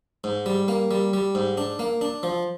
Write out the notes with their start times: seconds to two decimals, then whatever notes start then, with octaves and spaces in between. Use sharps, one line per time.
0.24 G#2
0.46 G3
0.68 A#3
0.91 G3
1.13 G3
1.35 G#2
1.57 D4
1.79 A#3
2.01 D4
2.23 F3